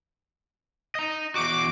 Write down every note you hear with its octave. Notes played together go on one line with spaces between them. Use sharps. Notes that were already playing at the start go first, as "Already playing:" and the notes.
D#5 A#5
E2 F#4 D6